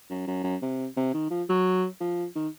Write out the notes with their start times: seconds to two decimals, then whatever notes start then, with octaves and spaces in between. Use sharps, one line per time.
0.10 F#2
0.27 F#2
0.44 F#2
0.62 C3
0.97 C3
1.14 D#3
1.31 F3
1.49 F#3
2.00 F3
2.36 D#3